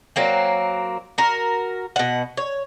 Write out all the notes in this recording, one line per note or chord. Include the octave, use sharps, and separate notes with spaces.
F#3 A#3 C4
F#4 A#4
B2 F#5
C#5